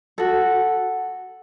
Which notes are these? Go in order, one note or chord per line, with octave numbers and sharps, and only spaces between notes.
F#4 A4